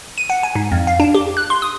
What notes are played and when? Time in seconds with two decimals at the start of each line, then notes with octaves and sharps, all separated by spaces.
0.18 D#7
0.30 F#5
0.43 G#5
0.55 G#2
0.72 F2
0.87 F5
1.00 D4
1.15 G4
1.37 F#6
1.50 C6
1.62 D#6